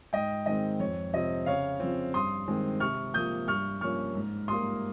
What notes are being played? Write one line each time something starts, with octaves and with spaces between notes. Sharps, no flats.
G#2 D#5 G5
D#3 G#3 C4 D#5
F2 C#5
C3 F3 C4 D#5
C#3 C#5 F5
F3 C4
G2 C6 D#6
D#3 G#3 C4
C3 C#6 F6
F3 A#3 D#6 G6
G2 C#6 F6
F3 A#3 C#4 C#6 F6
G#2
G3 A#3 C6 D#6